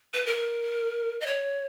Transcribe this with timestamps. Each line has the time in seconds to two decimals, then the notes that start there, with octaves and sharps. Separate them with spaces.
0.14 B4
0.26 A#4
1.21 D#5
1.26 C#5